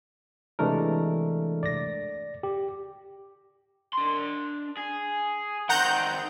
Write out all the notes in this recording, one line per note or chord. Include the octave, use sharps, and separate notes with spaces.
C3 E3 G#3 A3 D4 A#4
D5 A#6
G4
D4 C6
G#4
D#3 C4 F#5 A#5 G6